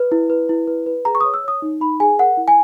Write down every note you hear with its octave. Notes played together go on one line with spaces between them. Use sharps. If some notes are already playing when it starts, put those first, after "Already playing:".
Already playing: B4
E4
B4
E4
B4
B4
G#4 A#5
C#6
C#5 D#6
E6
C#5 D#6
D#4
D#4 B5
G#4 G#5
A#4 F#5
E4
G#5